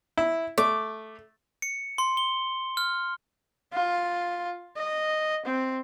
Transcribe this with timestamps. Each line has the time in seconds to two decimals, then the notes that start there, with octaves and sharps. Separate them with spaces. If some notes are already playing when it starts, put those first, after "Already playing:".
0.18 E4
0.58 A3 D6
1.62 C#7
1.98 C6
2.17 G7
2.77 F6
3.73 F4
4.77 D#5
5.46 C4